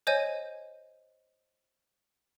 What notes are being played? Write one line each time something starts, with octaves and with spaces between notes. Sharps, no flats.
C5 C#5 D#5 G#5 G6 D#7